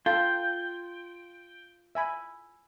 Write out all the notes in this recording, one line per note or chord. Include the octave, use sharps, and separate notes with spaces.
F4 A4 F5 G5 A5
E5 G#5 B5